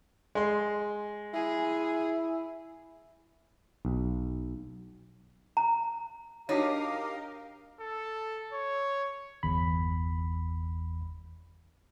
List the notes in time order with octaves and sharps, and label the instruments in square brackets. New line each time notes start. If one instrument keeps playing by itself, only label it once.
[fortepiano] G#3 C6
[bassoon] E4 [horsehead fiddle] G#4
[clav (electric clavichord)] B1
[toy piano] A#5
[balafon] D4 F#4 C#5 [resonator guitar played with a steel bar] D#4 [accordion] G4 A#4 F5
[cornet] A4
C#5
[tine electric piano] G1 E2 B5